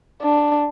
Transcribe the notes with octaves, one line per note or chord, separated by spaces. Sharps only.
D4